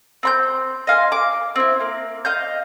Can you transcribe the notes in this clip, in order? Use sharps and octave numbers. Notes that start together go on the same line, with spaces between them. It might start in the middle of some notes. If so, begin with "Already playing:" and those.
C4 B5 G6
D#5 F5 G#5 C6
D6
C4 E4
A#3
D#5 F5 G6